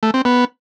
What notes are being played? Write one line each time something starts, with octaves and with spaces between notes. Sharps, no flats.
A3
C4
B3